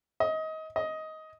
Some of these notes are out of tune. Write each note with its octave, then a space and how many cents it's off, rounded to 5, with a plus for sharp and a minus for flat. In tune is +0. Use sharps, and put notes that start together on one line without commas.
D#5 +25
D#5 +15